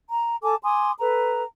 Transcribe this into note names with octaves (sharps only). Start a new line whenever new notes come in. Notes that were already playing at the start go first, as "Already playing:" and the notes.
A#5
A4 G#5 A5 D6
G#5 C6 D6 D#6
A4 B4 A#5